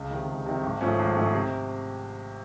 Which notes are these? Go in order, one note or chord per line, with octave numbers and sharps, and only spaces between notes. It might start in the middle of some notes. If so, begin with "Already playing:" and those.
Already playing: C#2
C3 D#3
C#2
C3 D#3
G#1
G#2 F3 A3 C#4
G#1
G#2 F3 A3 C#4
C3